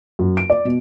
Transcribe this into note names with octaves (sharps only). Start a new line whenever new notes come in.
F#2
D7
D5
B2